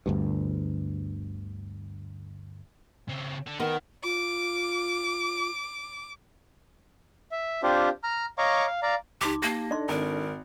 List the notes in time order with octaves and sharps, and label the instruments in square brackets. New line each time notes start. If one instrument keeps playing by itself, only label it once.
[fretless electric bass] G1 D2 G2
[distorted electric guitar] C#3 C4
D3 D4
[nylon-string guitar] D#3 B3 [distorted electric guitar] D#4 A#4
[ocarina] F4 [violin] D6
[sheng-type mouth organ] E5
C4 D4 F4 G4 C5
A#5 F6
C#5 D#5 F5 A#5 C#6 D6
F5
D5 F5 A#5
[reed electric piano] C#2 [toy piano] D#4 C6 D6 [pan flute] G4
[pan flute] A#3 [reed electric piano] G4 A5 [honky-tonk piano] A#6
[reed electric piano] D4 D#4 A4 [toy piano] D5 D#5 C6
[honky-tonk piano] G#1 [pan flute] A#4